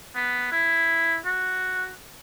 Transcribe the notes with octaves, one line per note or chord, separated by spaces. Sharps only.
B3
E4
F#4